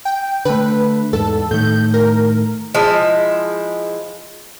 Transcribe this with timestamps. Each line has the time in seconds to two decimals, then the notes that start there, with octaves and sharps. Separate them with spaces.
0.05 G5
0.45 D3 A3 B4
1.13 E2 G#2 A4
1.51 A2 D#3 A3 G6
1.94 A#4
2.75 F3 G#3 E4